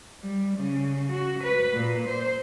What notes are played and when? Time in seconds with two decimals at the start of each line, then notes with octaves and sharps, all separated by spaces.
0.23 G3
0.57 C#3
1.11 F#4
1.43 B4
1.74 A#2
2.08 C5